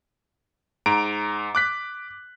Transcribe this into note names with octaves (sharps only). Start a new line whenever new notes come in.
G#2 A#5 D7
D6 F#6 B6